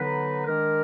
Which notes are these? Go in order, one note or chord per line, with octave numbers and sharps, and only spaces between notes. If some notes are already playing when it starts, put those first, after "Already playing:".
Already playing: D3 F#3 B3 D#4 B4
D#3 G#3 D4 A#4